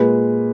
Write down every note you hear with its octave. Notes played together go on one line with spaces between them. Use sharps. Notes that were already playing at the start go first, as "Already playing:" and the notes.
Already playing: A#2 G#3 B4